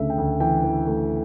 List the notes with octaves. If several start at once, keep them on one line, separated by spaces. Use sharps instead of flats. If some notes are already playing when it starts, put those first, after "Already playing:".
Already playing: D2 C#3 A3 E5
G5
D2
E3 G5
E3
A3